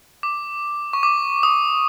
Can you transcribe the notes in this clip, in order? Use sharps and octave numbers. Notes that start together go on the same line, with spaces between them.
D6
C#6
D6
D#6